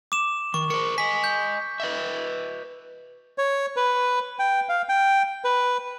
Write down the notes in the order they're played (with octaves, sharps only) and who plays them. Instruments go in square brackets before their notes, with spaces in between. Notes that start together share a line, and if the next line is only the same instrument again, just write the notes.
[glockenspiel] D6 E7
[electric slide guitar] D#3 [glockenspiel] C#6
[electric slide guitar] A#4 C5 [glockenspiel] C#7
[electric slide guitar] D#5 G#5 [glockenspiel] B6
[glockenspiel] G6
[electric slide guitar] B4 D#5 E5
[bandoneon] C#5
B4
G5
F5
G5
B4